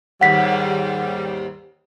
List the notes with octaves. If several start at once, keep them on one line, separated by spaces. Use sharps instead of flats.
D#2 G#2 G3 F#5 B6